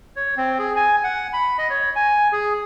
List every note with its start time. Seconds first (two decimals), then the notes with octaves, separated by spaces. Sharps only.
0.16 C#5
0.37 C4
0.59 G#4
0.76 G#5
1.04 F#5
1.33 B5
1.58 D#5
1.70 C#5
1.96 G#5
2.32 G#4